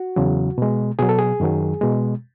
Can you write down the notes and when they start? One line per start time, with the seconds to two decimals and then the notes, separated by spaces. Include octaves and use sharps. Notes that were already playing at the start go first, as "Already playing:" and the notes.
Already playing: F#4
0.16 E2 C#3 F#3
0.58 B2 G#3
0.99 B2 F#3 G#4
1.09 A4
1.19 G#4
1.40 F#2 D#3 F#3
1.81 B2 G#3